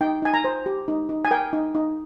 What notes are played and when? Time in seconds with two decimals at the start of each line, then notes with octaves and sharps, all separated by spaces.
0.01 D#4 G5
0.22 D#4 G#5
0.34 A#5
0.44 C5
0.66 G4
0.88 D#4
1.09 D#4
1.25 G#5
1.31 A#4 G5
1.53 D#4
1.75 D#4